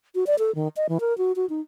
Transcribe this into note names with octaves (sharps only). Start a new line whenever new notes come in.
F#4
D5
A4
D#3
D#5
E3
A#4
F#4
F#4
D#4